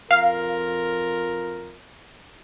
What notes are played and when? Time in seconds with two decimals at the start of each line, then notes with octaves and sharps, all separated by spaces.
0.11 F2 F4 A#4 F5